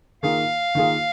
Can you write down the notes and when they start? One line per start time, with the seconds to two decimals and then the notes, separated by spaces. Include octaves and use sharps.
0.22 D#3 A#3 F4 G#4 F5
0.75 D#3 A#3 F4 G#4